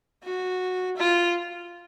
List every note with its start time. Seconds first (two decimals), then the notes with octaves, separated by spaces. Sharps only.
0.24 F#4
0.96 F4